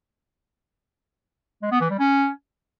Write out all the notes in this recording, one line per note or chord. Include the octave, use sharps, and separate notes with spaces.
G#3
B3
E3
G3
C#4